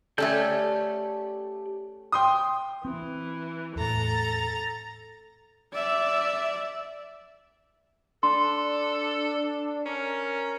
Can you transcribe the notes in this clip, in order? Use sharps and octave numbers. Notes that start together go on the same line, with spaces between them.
A3 C#4 G4 A4 D5 G6
G5 C6 D#6
E3 C4
E2 A2 A4 A#5 A6
D5 E5
D4 A4 C6
C#4 A#4